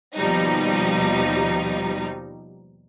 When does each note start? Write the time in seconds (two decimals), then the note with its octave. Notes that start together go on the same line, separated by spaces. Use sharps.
0.16 D#2 B2 F3 G3 D#4